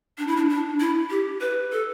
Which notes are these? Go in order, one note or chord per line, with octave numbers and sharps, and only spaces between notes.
D4
E4
D4
D4
E4
G4
B4
A4